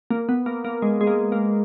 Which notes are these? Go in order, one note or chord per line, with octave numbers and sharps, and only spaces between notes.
A#3
B3
A#3
A#3
G#3
G#3
A#3
A#3